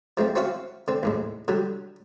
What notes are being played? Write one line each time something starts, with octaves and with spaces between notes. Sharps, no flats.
F3 G#3 A3 C4
C4 C#4 F#4 E5 F5
D3 C4
D#2 A2 G#3
D3 F#3 G3